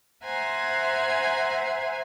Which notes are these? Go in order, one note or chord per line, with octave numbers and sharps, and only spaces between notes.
C5 E5 F#5 G#5 A#5